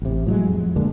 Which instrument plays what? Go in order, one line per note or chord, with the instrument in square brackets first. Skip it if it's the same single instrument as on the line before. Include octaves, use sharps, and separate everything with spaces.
[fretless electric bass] A1 C3
A2 F#3 G#3
F2
D3 G#3 A#3 D4